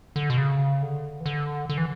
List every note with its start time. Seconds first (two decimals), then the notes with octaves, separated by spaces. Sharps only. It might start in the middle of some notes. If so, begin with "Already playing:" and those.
0.16 D3
0.30 B2
0.37 C#3
0.82 D3
1.20 E3
1.26 D3
1.69 D3
1.78 E3